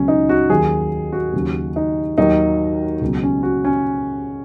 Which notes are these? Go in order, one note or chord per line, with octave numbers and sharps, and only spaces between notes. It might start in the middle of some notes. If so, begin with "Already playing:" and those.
Already playing: C#2 B2 F#3 C#4
D#4
F#4
D#2 D#3 F#3 G#4
F#4
D#2 C#3 F#3
D#4
D#2 D#3 F#3 D#4
C#2 B2 F#3
C#4
F#4
C#4